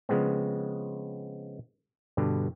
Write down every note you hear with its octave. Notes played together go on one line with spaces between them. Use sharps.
C#3 F3 G#3 B3 C4
G2 B2 D3